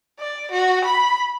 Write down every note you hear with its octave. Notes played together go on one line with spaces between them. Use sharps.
D5
F#4
B5